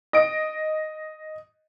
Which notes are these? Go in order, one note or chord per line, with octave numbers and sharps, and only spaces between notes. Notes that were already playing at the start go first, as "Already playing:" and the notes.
D#5 D7